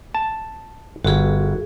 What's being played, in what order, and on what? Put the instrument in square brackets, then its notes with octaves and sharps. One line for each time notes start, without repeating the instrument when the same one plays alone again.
[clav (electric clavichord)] A5
[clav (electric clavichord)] G1 [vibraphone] F#4 G#4